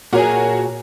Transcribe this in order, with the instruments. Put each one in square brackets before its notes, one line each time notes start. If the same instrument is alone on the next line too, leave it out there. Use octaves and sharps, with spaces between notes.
[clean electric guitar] A#2 G#4 [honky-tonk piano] F#4 A#4 C#5